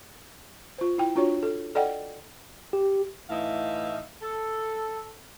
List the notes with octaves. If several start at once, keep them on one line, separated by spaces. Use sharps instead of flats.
F4 C5
E4 G5
D4 F4 F#4 C#5
A4
A4 D5 D#5 F#5 G5
G4
A2 E3 D#4 E5 F5
A4